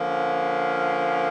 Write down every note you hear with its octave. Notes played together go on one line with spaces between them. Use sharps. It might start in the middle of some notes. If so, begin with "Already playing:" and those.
Already playing: D3 F3 A#3 C#4